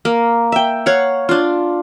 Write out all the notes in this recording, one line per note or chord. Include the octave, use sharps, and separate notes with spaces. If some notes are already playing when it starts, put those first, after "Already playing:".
A#3
E5 G5
C#5 F5 F#5
D4 F4